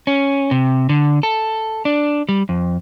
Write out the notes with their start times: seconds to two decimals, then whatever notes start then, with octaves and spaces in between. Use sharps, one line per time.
0.07 C#4
0.51 C3
0.89 D3
1.23 A4
1.85 D4
2.29 G3
2.49 F2